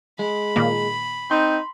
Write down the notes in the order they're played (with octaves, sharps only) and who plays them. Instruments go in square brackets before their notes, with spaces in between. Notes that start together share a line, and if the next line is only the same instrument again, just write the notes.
[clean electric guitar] G#3 [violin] B5
[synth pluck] A#2 D#3 A#3
[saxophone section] C4 D#4 [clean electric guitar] C6